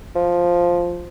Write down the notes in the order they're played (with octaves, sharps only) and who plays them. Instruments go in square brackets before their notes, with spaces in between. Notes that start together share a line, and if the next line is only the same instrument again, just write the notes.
[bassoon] F3